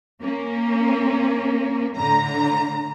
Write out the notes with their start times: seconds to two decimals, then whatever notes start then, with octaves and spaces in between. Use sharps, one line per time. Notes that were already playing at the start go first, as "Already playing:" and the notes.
0.22 A#3 C#4
1.96 A2 D3 A#5